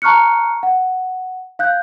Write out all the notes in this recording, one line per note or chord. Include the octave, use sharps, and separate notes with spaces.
A5 A#5 C#6 F6 F#6 C#7
F#5
F5 F#6 G6